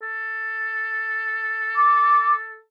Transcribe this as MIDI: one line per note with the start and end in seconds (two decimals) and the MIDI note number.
0.02 2.61 69
1.75 2.32 86